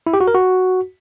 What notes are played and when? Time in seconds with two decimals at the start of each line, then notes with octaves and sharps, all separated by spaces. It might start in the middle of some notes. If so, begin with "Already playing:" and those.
0.07 E4
0.14 G4
0.20 F#4
0.27 A#4
0.34 F#4